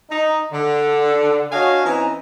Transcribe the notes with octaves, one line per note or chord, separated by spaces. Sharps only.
D#4
D3
D4 F#4 C#5 D#5 F5 G#5
E3 C4 C#4 D#4